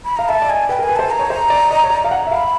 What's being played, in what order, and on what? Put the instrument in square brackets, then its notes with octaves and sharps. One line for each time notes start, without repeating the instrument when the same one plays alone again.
[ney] B5
[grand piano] F5 [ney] A#5
[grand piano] E5 [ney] A5
[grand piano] D5
[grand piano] D#5 [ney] G#5
[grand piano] B4 [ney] G5
[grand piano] A#4
[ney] G#5
[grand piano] B4
[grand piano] C5 [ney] A5
[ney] A#5
[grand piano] C#5
C5
D5
D#5
C#5
D5
F5
F#5
E5
[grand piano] F5 [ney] B5